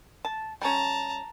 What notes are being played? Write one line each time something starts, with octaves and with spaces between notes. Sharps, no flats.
A5
G3 C#4 A5 A#5